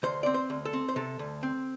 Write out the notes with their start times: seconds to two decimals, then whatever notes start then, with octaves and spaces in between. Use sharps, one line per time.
0.03 D2 C5
0.23 C4 D5
0.34 C5
0.50 D2
0.65 A4
0.73 C4
0.89 C5
0.96 C3 A4
1.19 D2
1.43 C4